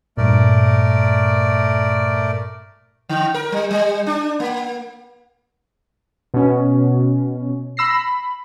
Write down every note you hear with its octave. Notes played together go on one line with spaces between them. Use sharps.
G2 A#2 A3 A#4 D5
D3
A#4
G3
G3
D4
A#3
B2 C#4
B5 E6 A#6 C7
B5